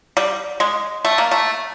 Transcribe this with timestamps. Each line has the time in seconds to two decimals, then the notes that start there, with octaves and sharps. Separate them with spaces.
0.17 G3
0.60 G#3
1.05 A3
1.18 A#3
1.31 A3